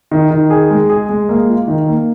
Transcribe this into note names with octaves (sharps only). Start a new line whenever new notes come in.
D#3
D#3
G#4
G#3
G#4
G#3
A#3
F4
D#3
A#3